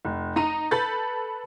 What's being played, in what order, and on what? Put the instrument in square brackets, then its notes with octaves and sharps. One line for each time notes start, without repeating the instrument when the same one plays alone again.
[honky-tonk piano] F1
D#4 A#5 D#7
A4 B4 B5 G6 A6